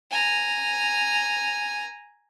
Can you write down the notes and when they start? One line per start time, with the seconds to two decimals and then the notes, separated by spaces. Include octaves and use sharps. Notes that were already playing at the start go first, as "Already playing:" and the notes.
0.11 G#5 A#5